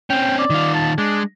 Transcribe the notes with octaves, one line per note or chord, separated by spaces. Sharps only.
C4 C#4 G5
D5
D#3 F4
A5
G#3 D4